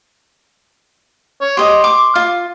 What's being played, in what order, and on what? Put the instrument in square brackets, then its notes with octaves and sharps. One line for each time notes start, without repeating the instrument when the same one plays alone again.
[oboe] C#5
[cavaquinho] G4 D#5 [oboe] C6
[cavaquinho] D6
F4